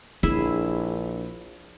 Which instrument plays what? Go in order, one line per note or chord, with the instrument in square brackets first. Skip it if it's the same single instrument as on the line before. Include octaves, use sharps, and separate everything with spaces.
[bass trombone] A#1 [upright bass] D4 [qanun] E4 G#4 E5